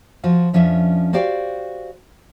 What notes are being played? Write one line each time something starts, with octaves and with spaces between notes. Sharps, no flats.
F3 F4 F#4
F2 F3 C#4 D4 E5
F#4 G4 C5 D5 F5 G5